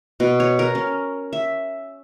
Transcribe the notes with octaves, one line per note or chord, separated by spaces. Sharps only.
B2
C#5
A#4
C#4
E5